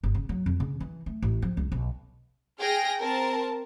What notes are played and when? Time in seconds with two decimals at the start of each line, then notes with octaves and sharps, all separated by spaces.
0.04 G1
0.15 C#3
0.29 F#3
0.46 F2
0.60 C#3
0.80 E3
1.06 A3
1.22 A1
1.42 F3
1.57 C#2
1.72 B1
2.60 G#4 G5 F6 A#6
2.99 C4 A#4 A5